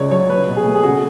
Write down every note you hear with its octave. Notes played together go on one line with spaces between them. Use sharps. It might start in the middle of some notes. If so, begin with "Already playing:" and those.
Already playing: C#2 C#3 C#5 D5
F#3 C#5
F#3 B4
B2
G#4
A3
G#4
C#3 F#4